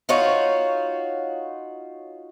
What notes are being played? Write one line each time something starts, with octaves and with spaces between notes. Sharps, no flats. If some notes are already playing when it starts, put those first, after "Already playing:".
D#4 F4 F#4 C#5